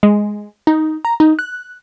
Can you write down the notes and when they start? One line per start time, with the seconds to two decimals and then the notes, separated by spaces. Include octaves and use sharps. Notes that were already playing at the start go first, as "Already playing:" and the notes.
0.03 G#3
0.67 D#4
1.05 A#5
1.20 D#4
1.39 F#6